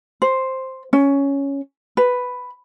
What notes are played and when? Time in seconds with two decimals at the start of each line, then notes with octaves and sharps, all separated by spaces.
0.22 C5
0.93 C#4
1.97 B4